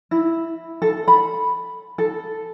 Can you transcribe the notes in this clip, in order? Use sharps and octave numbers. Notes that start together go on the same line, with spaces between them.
E4
A4
B5
A4